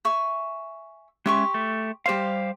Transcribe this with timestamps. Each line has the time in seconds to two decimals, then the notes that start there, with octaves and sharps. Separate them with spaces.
0.05 E5 G#5 C#6
1.26 G#3 C#4 G4 E5 C6 C#6
1.54 A3
2.06 G3 G4 C5 F5 C6